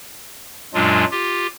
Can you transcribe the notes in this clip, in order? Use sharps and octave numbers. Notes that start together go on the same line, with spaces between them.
F#2 A#2 F#3 G#3 D4 F4
F4 G4